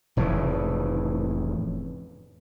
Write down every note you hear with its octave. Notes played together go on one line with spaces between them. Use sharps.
F1 A2 C#3 E3